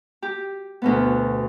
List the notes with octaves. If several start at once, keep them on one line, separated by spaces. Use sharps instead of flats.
G4
D2 B2 B3